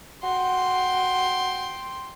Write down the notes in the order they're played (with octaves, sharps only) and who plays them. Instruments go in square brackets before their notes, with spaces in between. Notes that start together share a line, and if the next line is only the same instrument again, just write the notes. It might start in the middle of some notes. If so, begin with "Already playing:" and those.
[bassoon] F#4 [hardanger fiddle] G5 C6